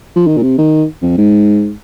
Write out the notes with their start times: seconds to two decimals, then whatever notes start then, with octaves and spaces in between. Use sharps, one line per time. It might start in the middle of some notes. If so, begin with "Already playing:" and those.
0.16 F3
0.27 D#3
0.37 A#2
0.42 C3
0.58 D#3
1.02 F2
1.18 G#2